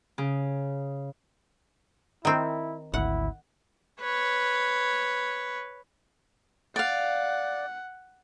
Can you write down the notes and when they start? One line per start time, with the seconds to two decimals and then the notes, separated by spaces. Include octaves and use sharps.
0.18 C#3
2.25 D#3 C4 E4
2.94 G#1 D2 E4 F#5
4.01 B4 C#5
6.76 D5 F5 F#5